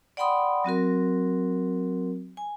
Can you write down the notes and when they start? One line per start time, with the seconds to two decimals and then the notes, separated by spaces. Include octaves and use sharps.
0.17 D5 F#5 G5 B5 C6 D#6
0.64 F#3 C4 F#4 A#4
2.37 G#5